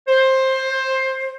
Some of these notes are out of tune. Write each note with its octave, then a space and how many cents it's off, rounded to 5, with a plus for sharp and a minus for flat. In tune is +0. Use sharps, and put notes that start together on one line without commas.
C5 +15